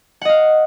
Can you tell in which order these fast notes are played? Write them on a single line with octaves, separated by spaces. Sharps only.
F#5 D#5 F5